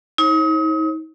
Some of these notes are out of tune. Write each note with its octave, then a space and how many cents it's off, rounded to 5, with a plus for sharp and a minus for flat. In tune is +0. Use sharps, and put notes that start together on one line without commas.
D#4 +35 C#5 -45